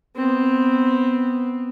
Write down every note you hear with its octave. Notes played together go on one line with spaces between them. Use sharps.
B3 C4